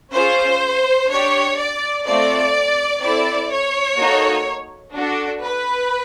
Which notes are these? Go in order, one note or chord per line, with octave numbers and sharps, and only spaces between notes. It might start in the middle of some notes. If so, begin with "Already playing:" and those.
C#4 F4 G#4 C5
D4 G4 C#5
D5
A3 C4 F4 A4 D5
C4 E4 A4 D5
C#5
A#3 D#4 F#4 A4
D4 F#4 A4
B4